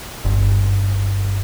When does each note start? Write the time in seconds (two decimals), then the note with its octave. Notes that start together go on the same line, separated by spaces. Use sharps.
0.25 G1